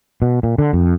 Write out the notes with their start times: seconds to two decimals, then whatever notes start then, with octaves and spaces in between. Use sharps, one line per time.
0.22 B2
0.43 A#2
0.58 D3
0.73 F2